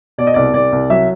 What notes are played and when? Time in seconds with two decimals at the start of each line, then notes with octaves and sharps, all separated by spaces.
0.18 B2 D5
0.27 D#5
0.34 C2 D5
0.53 C2 D5
0.72 C2
0.90 F#3 E5